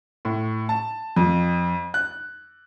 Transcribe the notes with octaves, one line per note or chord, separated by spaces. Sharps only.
A2
A5
F2
F#6